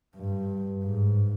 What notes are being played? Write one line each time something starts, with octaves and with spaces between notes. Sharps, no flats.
G2
G#2